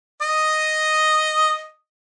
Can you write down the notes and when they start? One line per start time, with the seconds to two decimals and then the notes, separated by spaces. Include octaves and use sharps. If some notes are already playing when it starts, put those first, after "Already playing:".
0.22 D#5 D#6